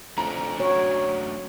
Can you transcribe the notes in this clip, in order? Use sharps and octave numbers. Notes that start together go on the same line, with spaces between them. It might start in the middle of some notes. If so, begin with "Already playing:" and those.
F2 A3 C#4 D4 A#5
F#3 F#4 C#5